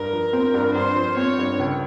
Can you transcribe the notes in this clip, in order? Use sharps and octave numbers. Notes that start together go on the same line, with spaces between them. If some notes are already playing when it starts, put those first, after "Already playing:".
Already playing: G2 A#4
F3
C4
G2
G2 C5
F3
C4 C#5
G2
C#2